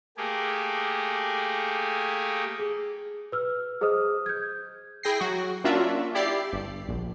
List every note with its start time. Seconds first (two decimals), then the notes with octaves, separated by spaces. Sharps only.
0.17 A3 A#3 G4 G#4
2.59 G#4
3.32 B4 E6 F6
3.81 G#4 C5 D#5 D#6 F6
4.26 G6 G#6
5.03 E4 G#4 G5 A#6 C7
5.20 F#3 F#4
5.64 A#3 C#4 D4 F4 F#4 E5
6.14 E4 G4 D5 C7
6.53 G1
6.88 A#1